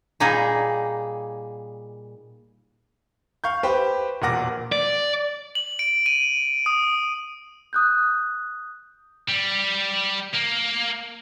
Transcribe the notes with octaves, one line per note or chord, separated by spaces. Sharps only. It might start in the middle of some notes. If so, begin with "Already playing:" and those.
A#2 G3 A#3 D#4 G#4
F5 C#6 G6
G4 B4 C5 G5
E1 A#2 A#4 F#5 D6 A#6
D5
F#7
D7
D#7
D#6
D#6 F#6 G6
G3
A#3